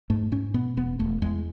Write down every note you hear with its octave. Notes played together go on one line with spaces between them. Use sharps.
G#2 A3
G#2 C#4
B2 B3
E1 B3
E1 A3
E2 G#3